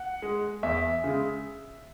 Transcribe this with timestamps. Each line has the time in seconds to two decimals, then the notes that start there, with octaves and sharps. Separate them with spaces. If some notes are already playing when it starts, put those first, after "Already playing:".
Already playing: F#5
0.22 G#3
0.63 E2 E5
1.04 C#3 G#3